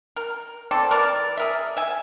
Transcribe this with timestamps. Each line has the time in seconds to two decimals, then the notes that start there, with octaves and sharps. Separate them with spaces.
0.16 A#4
0.71 C4 A4 D5
0.90 E3 A#4 D5
1.37 G#4 A#4 E5
1.77 E5 G#5